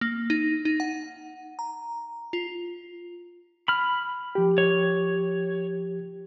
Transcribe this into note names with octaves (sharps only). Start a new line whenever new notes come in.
A#3
D#4
D#4
F#5
A#5
F4
B5 F6
F3 G4
C#5